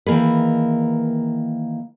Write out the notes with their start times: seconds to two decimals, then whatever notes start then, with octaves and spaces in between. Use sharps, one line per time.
0.06 D#3 E3 A#3 G#4 B4